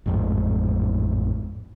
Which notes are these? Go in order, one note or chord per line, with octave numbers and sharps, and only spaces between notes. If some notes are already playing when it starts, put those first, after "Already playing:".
A1 F2 G#2